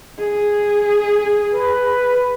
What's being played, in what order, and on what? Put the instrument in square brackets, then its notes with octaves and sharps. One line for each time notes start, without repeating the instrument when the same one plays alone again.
[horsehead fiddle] G#4
[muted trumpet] B4